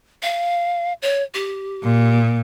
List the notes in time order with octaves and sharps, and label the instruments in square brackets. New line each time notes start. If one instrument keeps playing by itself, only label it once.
[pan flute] F5
C#5
G4
[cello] A#2